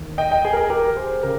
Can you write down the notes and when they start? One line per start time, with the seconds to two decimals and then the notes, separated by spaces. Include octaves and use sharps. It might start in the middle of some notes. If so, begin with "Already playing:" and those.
Already playing: D#2 D#3
0.18 D#5 G5
0.31 D#5 G5
0.45 G#4
0.53 A#4
0.57 G#4
0.70 G4 A#4
0.96 G#4 C5
1.23 C#3 G4 A#4